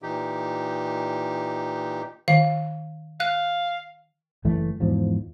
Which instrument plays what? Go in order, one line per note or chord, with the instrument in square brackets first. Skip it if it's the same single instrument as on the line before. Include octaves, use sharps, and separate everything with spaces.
[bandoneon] A#2 E3 D#4 G4
[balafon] D#3 [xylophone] F5
[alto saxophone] F5 [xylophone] F#6
[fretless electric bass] F#1 E3 A3
E2 G#2 F3